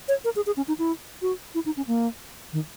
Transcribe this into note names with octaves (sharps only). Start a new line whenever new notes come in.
C#5
A#4
G#4
G#4
C#4
D#4
E4
F#4
E4
D#4
C#4
A#3
D#3